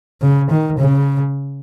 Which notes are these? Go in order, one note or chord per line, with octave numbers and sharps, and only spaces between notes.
C#3
D#3
C#3